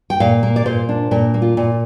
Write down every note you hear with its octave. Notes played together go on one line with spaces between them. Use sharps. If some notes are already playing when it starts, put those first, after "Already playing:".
G5
A#2 F5
A#3
D5
A#2 C5
D4
A#2 A#4
A#3
F4
A#2